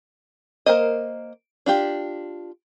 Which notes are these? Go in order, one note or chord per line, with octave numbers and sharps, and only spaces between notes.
A#3 C#4 A#4 C5 D#5
D4 F4 G4